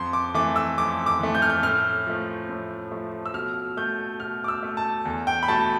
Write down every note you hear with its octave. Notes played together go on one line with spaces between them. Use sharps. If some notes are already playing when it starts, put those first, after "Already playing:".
Already playing: F2 C6
D6
E3 A3 D6
E6
F2 D6
D6
E3 A3
G6
F6
G6
A2 F6
F3 A3
A2
F3 A3
E6
B2 F6
A3 G6
B2 F6
D6
E6
A3
A5
E2
G5
B5
B2 A3 A5